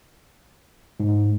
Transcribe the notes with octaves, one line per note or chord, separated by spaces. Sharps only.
G#2